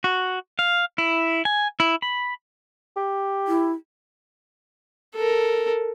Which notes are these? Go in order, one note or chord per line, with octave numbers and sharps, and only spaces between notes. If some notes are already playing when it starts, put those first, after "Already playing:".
F#4
F5
E4
G#5
E4
B5
G4
E4
A4 A#4